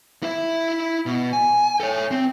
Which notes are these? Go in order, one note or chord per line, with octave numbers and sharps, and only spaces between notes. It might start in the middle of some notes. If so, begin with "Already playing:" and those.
E4 E5
B2
G#5
A4 C#5
C4